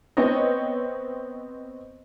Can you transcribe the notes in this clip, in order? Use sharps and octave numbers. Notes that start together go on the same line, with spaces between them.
B3 C4 C#5 D#5